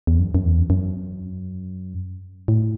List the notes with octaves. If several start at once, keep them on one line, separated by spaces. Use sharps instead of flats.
E2
F#2
F#2
E2
F#2
A2